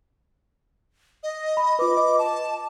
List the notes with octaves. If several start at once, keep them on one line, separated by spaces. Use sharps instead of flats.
D#5
B5
F4 B4 D6
D#5
A5